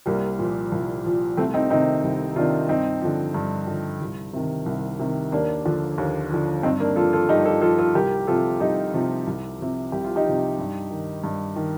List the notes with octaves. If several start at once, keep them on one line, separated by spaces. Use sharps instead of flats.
C2 G3 A#3
A#2 F3
C2
A#2 F3
C2 A3 C4
C4 D#4
C3 D#3 C4 D#4
C2
C3 D#3 D4 F4
G2 C4 D#4
D3 F3
G2
D3 F3
C2
C3 D#3
C2
C3 D#3
D#2 A#3 D4
D3 F3
D#2
D3 F3
G2 C4 D#4
A#3 D4
F3 F4 A4
F4 A4
G2 D#4 G4
F4 A4
F3 F4 A4
F4 A4
C2 G4 A#4
C3 F3 F4 A4
C2 D#4 G4
C3 F3
C2
C3 F3
C2 G4
F4
D#4 G4
C3 F3
G2
D#3
G2
D#3